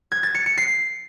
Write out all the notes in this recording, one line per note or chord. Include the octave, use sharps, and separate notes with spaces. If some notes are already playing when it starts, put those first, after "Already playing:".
G#6
A6
C#7
C#7
C7